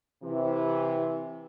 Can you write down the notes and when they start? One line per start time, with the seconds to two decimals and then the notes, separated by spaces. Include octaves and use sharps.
0.23 C3 E3